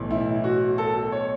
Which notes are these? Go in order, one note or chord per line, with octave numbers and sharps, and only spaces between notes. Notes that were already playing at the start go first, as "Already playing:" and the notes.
Already playing: B1 A2 E3
E4
F#4
A4
C#5